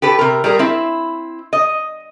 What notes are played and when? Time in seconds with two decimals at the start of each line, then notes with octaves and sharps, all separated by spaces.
0.02 G4 A4 B4
0.19 C3 A#4
0.44 G3 G#4 A#4
0.59 C4 E4
1.53 D#5